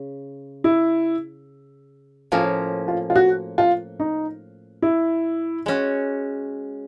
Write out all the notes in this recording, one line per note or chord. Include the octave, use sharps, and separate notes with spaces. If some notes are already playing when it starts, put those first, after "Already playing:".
Already playing: C#3
E4
A2 F3 A#3 C#4 F4
F4
F4
F#4
F4
D#4
E4
G#3 C#4 F#4